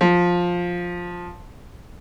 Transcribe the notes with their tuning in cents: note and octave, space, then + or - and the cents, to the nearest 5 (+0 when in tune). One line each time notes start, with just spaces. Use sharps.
F3 +10